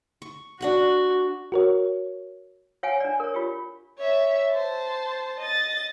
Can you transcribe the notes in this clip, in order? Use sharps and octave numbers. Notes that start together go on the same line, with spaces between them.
C#6
D4 F#4 F#5 C#6
F#4 A#4 C#5
C#5 F5 F#5 G#5
D4 D5
A#4 C#5
F4 G4
C#5 E5
C5 A5
D#5 A6